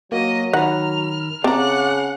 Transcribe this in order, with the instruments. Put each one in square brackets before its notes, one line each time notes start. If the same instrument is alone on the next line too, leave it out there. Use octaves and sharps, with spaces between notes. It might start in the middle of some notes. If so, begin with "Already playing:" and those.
[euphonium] F#3 [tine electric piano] A#3 F#4 [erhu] D#5
[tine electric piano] D#3 A#5 B5 [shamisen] F#5 [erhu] F6
[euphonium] C#3 [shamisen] C4 A#5 [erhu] F#5 [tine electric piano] A5 D6